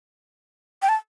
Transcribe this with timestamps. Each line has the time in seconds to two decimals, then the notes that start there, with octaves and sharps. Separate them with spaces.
0.82 G5
0.89 A5